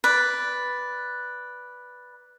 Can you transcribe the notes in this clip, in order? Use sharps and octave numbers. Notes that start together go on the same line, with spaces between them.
B4 D5